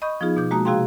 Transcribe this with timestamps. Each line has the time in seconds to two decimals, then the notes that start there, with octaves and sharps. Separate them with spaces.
0.02 D#5 B5 C#6 D#6 G6
0.21 F3 B3 D#4 F4 G#4
0.37 B2 D6 G6
0.51 G#3 A#3 F#4 A5 A#5 D#6
0.65 C3 F#4 G#4 F5 G5 C6